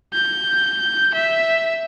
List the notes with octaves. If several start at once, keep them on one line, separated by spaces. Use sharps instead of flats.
G6
E5